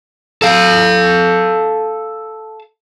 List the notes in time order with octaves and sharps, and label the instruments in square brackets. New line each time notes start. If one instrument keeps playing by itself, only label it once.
[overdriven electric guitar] A4 F5